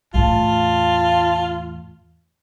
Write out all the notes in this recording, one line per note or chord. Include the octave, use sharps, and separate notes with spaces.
E2 A2 F4 A5